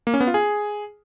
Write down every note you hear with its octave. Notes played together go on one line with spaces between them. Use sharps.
A#3
C#4
B3
F4
G#4